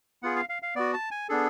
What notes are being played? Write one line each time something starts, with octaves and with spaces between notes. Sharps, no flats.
B3 F4 G#4 F#5
F5
F5
F5
B3 F#4 D5
A5
G#5
B3 D4 G#4 A4